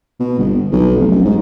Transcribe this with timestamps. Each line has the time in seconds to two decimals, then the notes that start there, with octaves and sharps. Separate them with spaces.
0.20 B2
0.38 G1
0.72 B1
0.97 F1
1.11 F#2
1.25 G#2